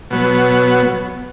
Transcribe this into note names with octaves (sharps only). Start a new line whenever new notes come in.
B2 F#3 B3